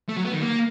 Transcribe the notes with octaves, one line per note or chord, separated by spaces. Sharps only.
A3
F#3
B3
D#3
A#3